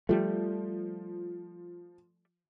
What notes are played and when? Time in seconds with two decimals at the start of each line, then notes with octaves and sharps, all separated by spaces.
0.09 F3 G3 A3